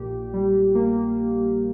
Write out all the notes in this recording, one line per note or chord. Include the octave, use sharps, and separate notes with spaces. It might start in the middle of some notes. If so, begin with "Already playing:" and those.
Already playing: A#1 A#2 G4
G3
A#3